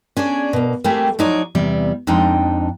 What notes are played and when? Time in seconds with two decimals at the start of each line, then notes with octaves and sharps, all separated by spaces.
0.17 C#4 D4 G#4 D5
0.53 B2 A#3
0.84 G3 A3 A#3 C4 G4 G#4
1.19 F3 F#3 D#4 C#5 D5
1.55 E2 C3 G3
2.07 F2 G#3 D4 D#4 G5